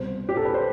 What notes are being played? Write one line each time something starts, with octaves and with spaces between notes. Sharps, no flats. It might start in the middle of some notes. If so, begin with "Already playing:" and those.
Already playing: C2 B2 C5
G4
A4
B4
C5